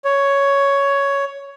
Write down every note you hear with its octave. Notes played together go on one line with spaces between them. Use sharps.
C#5